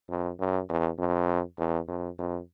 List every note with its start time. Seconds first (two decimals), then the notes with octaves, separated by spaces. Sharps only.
0.09 F2
0.39 F#2
0.69 E2
0.99 F2
1.58 E2
1.88 F2
2.18 F2